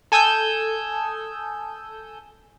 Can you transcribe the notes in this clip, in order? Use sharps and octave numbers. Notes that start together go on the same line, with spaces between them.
A4 G#5 D#6 E6 G6